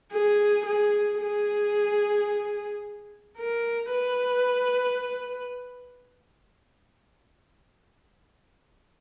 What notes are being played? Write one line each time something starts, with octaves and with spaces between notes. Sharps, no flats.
G#4
G#4
G#4
A#4
B4